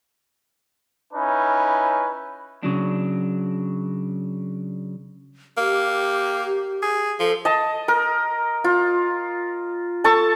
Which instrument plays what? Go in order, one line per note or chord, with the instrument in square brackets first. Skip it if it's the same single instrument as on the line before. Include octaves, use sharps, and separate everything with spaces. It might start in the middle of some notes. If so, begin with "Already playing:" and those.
[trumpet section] C#4 D#4 E4 B4
[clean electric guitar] C#3 F#3 D4
[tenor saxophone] A#3 [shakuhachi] G4
[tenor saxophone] G#4
[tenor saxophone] F3 [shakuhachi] A4
[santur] D#5 A5
A#4
F4
A4 A5 C#6